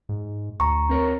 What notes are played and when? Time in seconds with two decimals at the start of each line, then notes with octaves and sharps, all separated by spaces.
0.09 G#2
0.60 D2 A#5 C#6
0.89 C4 A#4 C#5